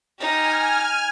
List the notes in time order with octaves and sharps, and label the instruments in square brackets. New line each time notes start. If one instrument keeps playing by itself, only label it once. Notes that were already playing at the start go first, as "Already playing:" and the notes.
[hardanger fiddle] D#4 G4 [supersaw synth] G#5 F6